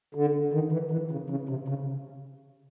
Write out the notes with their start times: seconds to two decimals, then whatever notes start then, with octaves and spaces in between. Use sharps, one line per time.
0.15 D3
0.53 D#3
0.72 E3
0.91 E3
1.11 C#3
1.30 C#3
1.49 C3
1.68 C#3